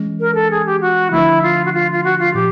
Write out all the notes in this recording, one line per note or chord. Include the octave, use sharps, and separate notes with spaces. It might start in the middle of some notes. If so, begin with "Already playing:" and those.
Already playing: E3 G#3 C#4
A#4
A4
G#4
G4
F#4
D3 F3 A3 D4 E4
F4
F#4
F4
F4
F#4
F4
A#2 F3 G4